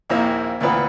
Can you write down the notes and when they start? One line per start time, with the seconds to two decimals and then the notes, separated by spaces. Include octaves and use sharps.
0.10 A#1 D#2 A#3 C4 E4 A#5
0.61 D2 A#2 E3 B3 C4